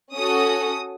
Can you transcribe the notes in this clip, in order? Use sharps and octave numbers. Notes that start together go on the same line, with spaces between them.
C#4 F#4 A4 D#6